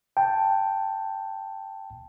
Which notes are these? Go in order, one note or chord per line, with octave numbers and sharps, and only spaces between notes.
G5 A5